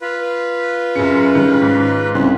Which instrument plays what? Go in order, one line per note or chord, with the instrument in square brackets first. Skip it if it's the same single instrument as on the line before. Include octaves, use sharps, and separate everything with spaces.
[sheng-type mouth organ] F4 B4
[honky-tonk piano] F#2 C#7 [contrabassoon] C#3
[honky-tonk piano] D#3 G3
G#2
[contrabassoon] C2 [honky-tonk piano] C#3 C6